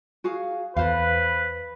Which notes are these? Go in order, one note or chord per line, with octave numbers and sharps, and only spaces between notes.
F#4 G#4 F5
E2 A4 B4 C5 F5